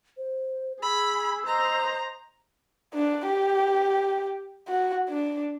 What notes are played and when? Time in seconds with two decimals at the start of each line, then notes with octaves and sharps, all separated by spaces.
0.17 C5
0.82 G#4 B5 E6
1.46 C5 D#5 A#5
2.94 D4
3.27 G4
4.68 F#4
5.10 D4